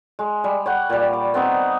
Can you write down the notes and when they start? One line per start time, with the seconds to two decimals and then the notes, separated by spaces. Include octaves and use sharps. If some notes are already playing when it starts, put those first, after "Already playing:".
0.19 G#3
0.44 G3
0.66 C#5 F#5 G5
0.90 A#2 G3
1.13 D5
1.34 B3 C4 D#4 D#5